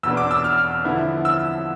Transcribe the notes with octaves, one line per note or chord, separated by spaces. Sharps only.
E2 B2 B3 D4 E6
D6
E6
F6
D3 F3 B3 E4
E6